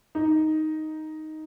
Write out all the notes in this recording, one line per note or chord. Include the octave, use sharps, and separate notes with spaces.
D#4